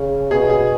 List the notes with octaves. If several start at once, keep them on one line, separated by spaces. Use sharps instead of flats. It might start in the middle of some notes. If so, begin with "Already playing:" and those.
Already playing: C#3
B2 G#4
G#4